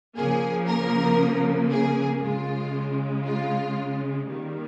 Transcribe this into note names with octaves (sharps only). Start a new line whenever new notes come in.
C#3 F3 A#3 G#4
A#4
G#4
C#3 G#3 F4
F4
D#3 G3 A#3